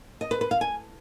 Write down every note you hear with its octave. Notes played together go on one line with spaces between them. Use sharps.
D#5
B4
B4
F5
G#5